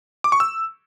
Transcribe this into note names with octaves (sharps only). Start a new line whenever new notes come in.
D6
C#6
E6